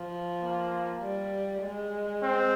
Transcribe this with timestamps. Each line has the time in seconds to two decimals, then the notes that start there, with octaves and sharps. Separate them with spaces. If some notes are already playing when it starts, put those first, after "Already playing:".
Already playing: F3
0.42 A#3
1.03 G3
1.63 G#3
2.23 C4